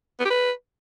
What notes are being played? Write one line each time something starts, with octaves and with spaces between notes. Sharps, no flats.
B3
G4
B4